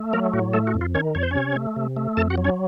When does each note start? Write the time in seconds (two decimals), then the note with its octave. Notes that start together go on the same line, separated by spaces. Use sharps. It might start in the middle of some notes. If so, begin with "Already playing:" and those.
Already playing: A3
0.13 F#3 A#3 A#4
0.33 A2 F#4
0.53 A3 A4
0.67 F#4
0.74 F2
0.81 F4
0.95 D#3 C#4 C#5
1.15 F2 C#5
1.23 C5
1.31 C3 C#4 C#5
1.56 A3
1.76 C3
1.97 A3
2.17 F2 A4 A5
2.30 F#4 F#5
2.38 F#3
2.44 C#4 C#5